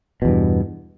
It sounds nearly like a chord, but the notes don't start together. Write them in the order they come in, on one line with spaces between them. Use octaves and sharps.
B2 E2 G2